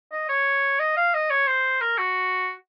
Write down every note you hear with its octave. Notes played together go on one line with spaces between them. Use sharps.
D#5
C#5
D#5
F5
D#5
C#5
C5
A#4
F#4